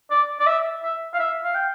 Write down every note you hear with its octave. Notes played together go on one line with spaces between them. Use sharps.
D5
D5
E5
E5
F5
E5
F5
G5